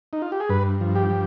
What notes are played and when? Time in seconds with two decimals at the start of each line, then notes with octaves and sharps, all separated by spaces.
0.13 D#4
0.22 F4
0.32 G4
0.40 G#4
0.49 G2 B4
0.81 F3
0.95 G4
1.10 F3